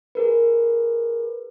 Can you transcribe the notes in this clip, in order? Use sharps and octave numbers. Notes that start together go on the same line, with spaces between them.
G#4 A#4 B4